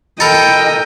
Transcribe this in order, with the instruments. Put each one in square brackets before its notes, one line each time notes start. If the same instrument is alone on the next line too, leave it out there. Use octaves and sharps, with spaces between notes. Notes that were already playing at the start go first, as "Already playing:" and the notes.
[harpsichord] A4 A#4 [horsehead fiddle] D#5 [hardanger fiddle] G5 [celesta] A#5 B5 C#7